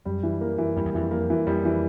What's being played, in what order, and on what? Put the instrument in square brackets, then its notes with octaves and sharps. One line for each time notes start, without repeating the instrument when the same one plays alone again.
[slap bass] F#2 [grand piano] G3
[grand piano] E3
A#3
E3
[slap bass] F2 [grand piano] G3
[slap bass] E2
[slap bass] F2 [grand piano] E3
[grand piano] A#3
E3
[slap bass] F2 [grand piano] G3
[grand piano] E3